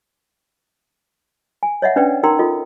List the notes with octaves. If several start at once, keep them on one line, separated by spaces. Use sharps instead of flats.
G#5
C#5 D#5 E5 F#5
C#4 D4 B4 D5 G5
D#4 A#4 G5 A#5 C6
F4 A4 D#5